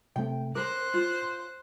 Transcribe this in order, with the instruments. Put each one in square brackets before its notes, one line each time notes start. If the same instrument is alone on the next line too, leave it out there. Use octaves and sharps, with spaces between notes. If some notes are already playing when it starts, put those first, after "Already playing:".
[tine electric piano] C3 A3 C4 [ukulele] G5
[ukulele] A#4 [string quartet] C5 F#6 [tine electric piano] D6
[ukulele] F4